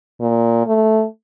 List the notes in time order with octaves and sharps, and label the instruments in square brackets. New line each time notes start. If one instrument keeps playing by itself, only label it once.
[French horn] A#2
A3